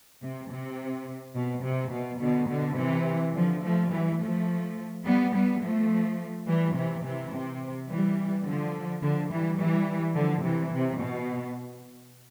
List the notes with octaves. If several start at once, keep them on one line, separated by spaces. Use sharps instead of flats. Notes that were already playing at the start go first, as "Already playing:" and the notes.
C3
C3
B2
C3
B2
B2 D3
B2 D3
C3 E3
D3 F3
F3 A3
E3 G3
F3 A3
G3 B3
G3 B3
F3 A3
E3 G3
C3 E3
C3 E3
C3
E3 G3
D3 F3
D3 F3
E3 G3
E3 G3
D3 F3
C3 E3
C3
B2